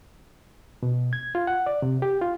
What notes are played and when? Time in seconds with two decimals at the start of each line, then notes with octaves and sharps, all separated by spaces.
0.83 B2
1.13 G#6
1.35 F4
1.47 F#5
1.66 D5
1.82 C3
2.02 G4
2.21 F4